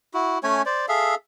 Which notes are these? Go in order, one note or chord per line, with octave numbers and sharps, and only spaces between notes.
E4 F#4
A3 C#4 C#5 G#5
C5 D5
G#4 A4 E5 F5